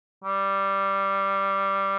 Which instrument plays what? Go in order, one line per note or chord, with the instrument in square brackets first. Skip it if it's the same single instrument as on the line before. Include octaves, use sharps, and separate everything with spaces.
[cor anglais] G3